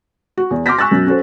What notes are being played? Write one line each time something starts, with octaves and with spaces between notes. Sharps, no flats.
F#4
E2
C6 D6 F6 G6 A#6 B6
G#5 C#6 E6 F#6 A6
F#2 B2
C#4 F#4 A4 C5